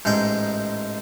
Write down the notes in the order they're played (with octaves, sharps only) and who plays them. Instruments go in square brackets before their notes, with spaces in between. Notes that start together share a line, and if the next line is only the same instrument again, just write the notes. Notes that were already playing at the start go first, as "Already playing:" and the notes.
[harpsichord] A1 G#2 G#3 G5